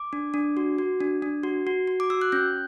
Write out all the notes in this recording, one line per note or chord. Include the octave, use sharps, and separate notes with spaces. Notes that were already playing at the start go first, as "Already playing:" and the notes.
Already playing: D6
D4
D4
F#4
F#4
D4
D4
F#4
F#4
F#4
D6
F#4 E6
F#6
C#4 G6